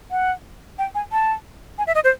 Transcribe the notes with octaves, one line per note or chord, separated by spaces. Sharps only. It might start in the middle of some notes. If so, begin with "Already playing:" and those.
F#5
G5
G#5
A5
G#5
E5
D#5
C5